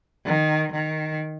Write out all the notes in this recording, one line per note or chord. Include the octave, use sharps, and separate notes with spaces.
D#3
D#3